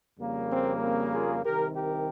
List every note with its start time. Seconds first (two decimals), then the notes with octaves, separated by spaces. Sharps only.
0.18 F2 C#3 G3 A#3
0.49 C4
0.82 C4
1.13 F4 G#4
1.45 C2 C3 D#3 G4 A#4
1.76 G4 A#4